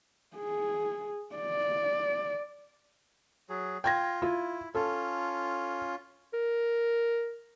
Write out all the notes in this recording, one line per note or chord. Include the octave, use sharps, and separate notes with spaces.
G#4
D5
F#3 G#4
F4 G5 G#6 A#6
E4 F4
C#4 F4 A4
A#4